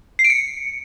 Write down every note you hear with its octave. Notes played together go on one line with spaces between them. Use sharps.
C7
D7
C#7